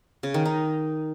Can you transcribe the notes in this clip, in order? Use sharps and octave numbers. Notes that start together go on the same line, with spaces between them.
C#3
D#3
D#4